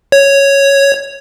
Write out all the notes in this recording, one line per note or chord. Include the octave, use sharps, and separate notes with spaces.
C#5